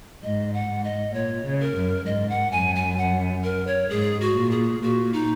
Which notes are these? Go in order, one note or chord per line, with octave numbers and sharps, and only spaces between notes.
G#2 D#5
F#5
G#2
D#5
A#2 C#5
C#3
A#4
F#2
G#2 D#5
F#5
F#2 G#5
G#5
F#5
A#4
C#5
G#2 G#4
F#4
A#2
G#4
A#2 F#4
D#4